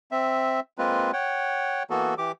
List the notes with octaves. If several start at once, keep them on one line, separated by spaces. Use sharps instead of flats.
C4 E5
G#3 A#3 C4 F4 B4
C#5 F#5 G5
E3 A#3 B3 F#4 A4
E3 G4 D6